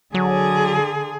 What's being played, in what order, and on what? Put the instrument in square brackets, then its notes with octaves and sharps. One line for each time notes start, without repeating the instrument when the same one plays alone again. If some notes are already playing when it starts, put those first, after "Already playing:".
[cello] D3 G#4 [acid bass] F#3